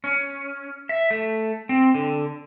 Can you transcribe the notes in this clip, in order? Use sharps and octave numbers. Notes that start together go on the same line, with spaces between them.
C#4
E5
A3
C4
D3